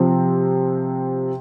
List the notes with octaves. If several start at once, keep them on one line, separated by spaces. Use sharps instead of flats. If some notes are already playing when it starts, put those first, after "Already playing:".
Already playing: C3 F3 C4